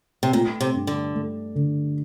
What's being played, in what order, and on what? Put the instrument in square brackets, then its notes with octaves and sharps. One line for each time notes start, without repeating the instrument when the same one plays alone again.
[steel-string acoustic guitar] C3
[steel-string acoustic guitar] A#2 [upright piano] A3
[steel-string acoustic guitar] C3
[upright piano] G2
[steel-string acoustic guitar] D3
[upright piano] A3
D3